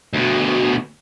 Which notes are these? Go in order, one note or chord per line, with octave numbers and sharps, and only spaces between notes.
D2 B2